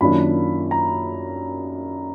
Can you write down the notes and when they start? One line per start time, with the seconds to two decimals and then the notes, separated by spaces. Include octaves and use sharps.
0.01 F#2 D#3 A#3 D4 F4 B5
0.71 A#5